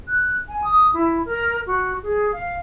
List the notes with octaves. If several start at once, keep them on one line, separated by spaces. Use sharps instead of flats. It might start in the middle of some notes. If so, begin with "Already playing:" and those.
F#6
G#5
D#6
E4
A#4
F#4
G#4
F5